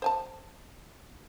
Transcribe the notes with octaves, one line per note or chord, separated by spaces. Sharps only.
C5 G#5 A5